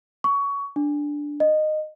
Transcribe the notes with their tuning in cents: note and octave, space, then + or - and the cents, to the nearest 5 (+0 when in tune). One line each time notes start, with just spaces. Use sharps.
C#6 +20
D4 -5
D#5 -15